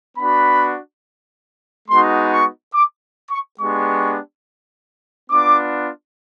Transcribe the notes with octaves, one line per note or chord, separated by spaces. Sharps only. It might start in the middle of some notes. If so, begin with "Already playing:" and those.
B3 D4 F#4 B5
G#3 B3 D#4 F#4 C6
C#6
D6
C#6
G#3 B3 D4 G4 C#6
B3 D4 F4 D6